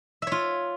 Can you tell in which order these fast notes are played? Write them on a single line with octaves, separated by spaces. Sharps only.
E5 C#5 F4